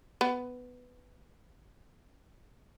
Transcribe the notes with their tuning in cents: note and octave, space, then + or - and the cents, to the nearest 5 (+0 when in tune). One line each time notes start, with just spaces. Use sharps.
B3 +10